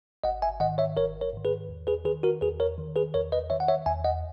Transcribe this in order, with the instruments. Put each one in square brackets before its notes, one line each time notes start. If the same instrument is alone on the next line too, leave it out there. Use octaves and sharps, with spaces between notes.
[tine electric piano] G#1 D#5 F#5
E5 G#5
G#2 D#3 D#5 F#5
C#5 E5
G#1 A#4 C#5
A#4 C#5
G#2 D#3
G#4 B4
E2
G#4 B4
D#3 G#4 B4
F#4 A#4
E2 G#4 B4
A#4 C#5
D#3
G#4 B4
E2 A#4 C#5
B4 D#5
D#3 C#5 E5
F#5
C#5 E5
E2 E5 G#5
D#5 F#5